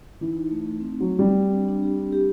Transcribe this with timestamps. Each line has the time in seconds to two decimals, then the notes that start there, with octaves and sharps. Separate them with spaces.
0.21 E3 D#4
0.37 D#4
0.51 A3
0.65 D#4
0.80 C4
0.95 D#4
1.00 F#3
1.09 C4
1.19 G3
1.25 C4
1.40 G4
1.54 D4
1.69 D4
1.83 G4
1.97 D4
2.12 G4